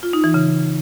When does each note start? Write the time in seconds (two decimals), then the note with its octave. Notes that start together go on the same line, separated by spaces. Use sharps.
0.03 F4
0.13 D#4
0.24 E3
0.34 C#3